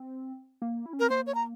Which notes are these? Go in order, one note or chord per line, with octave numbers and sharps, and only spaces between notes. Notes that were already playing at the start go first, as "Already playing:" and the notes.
Already playing: C4
A#3
E4
C#4
C4 A#4
A#3 C5
C#5
A#5